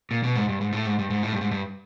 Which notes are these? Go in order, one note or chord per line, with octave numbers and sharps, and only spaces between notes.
A#2
B2
G#2
G2
G#2
A2
G#2
G2
G#2
A2
G2
G#2
G2